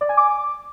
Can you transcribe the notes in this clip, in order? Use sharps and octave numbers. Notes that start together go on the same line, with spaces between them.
D5
G#5
D6